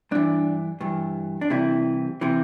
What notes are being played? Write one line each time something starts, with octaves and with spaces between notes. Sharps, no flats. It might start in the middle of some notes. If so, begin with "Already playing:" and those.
G2 E3 D4
G2 E3
D4
C2 C3 E3 E4
C3 E3